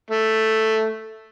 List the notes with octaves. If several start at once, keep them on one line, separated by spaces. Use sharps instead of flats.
A3